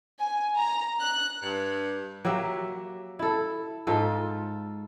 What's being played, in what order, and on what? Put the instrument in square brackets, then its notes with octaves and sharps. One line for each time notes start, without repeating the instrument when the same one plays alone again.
[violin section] G#5
A#5
F#6
[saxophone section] G2
[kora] F#3 A#3 G4 E5
E4 A4
G#2 F4 A4